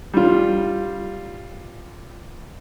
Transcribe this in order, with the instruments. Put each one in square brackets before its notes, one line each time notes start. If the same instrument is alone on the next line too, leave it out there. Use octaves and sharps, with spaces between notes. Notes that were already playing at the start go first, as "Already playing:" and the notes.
[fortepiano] G3 F4